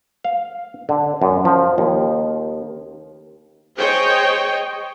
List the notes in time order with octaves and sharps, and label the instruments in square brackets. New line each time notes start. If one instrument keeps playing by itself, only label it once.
[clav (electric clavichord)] F5
D3
F#2
F3
D#2
[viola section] G#4 C5 C#5 D#5 G5